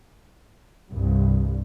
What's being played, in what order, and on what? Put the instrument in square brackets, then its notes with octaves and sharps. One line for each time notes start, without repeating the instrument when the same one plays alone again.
[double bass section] C2 G2